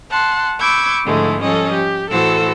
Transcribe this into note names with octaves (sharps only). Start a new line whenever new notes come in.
F#5 A5 C6
B5 C#6 D6 E6 G6 G#6
G#2 D3 F3 G#3 A3 E4
F3 G3 C#4 A4 D#5
G4
A2 E3 F#4 A4 C5 E6